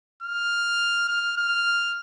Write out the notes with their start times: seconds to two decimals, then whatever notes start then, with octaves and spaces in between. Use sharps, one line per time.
0.22 F6
1.08 F6
1.37 F6